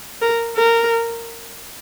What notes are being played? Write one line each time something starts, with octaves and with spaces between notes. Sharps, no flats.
A#4
A#4